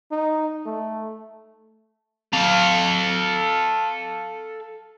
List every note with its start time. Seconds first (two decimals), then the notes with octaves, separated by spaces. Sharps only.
0.11 D#4
0.66 A3
2.33 A4 F5